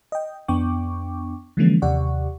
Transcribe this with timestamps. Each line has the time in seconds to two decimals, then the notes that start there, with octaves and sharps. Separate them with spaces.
0.12 D#5 G5
0.48 F2 B3 D4 G5 C#6 D6
1.57 D3 E3 F3 G#3 A#3 C#4
1.82 D#2 C3 G4 D5 F#5 C#6